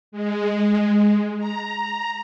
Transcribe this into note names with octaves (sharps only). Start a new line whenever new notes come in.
G#3
A#5